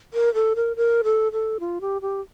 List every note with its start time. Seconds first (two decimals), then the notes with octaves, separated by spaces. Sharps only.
0.14 A#4
0.34 A4
0.56 A#4
0.76 A#4
1.04 A4
1.32 A4
1.60 F4
1.81 G4
2.02 G4